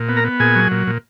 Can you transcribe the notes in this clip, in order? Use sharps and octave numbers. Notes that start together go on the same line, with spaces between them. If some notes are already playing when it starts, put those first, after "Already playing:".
Already playing: A#2
B3
A#4 A#5
B3
A#2 G#4 G#5
F#3
A#2
A#2